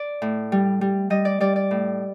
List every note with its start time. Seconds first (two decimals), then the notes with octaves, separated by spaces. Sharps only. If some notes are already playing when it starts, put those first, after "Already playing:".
Already playing: D5
0.22 A2
0.52 G3
0.81 G3
1.10 G3 D#5
1.25 D5
1.40 G3 D5
1.56 D5
1.71 A2